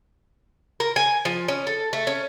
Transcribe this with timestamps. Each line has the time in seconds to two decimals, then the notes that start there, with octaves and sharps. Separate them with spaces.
0.80 A#4
0.96 G#5
1.25 F3
1.48 C#4
1.67 A4
1.93 A3
2.07 C#4